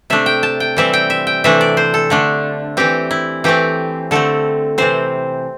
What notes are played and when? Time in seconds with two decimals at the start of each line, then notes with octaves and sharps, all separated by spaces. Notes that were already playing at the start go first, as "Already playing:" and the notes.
0.10 C3 A3 D4 E5
0.26 G5
0.43 A5
0.60 G5
0.77 E3 G3 C4 E5
0.94 G5
1.10 E5
1.27 G5
1.44 C3 E3 A3 D4 E5
1.61 D5
1.77 C5
1.94 A4
2.10 D3 A3 D4
2.77 E3 C4 G4
3.11 E4
3.44 E3 A3 C4 G4
4.11 D3 A3 C4 A4
4.78 C3 E3 C4 C5